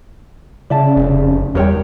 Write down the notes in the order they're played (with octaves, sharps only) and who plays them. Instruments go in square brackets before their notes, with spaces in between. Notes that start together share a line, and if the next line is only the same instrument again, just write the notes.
[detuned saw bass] C#3 [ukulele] D5 E5 A5
[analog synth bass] F1
[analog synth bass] E2 [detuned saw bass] G3 [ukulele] A#4 C#5 G5